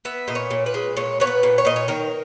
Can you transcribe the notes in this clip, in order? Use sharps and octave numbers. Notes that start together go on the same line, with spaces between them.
B3 E5
A#2 D#5
C#5
A#2
B4
G#3
A#2 C#5
B3 C#5
B4
A#2
C#5
A#2 D#5
C#5
D#3 A#4